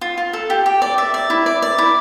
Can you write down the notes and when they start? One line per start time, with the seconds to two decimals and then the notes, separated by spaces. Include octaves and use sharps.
0.01 F4
0.18 F4
0.33 A4
0.50 G4
0.66 G4
0.82 D5
0.98 D5 E5
1.14 D5
1.30 E4
1.46 D5
1.62 D5
1.78 E4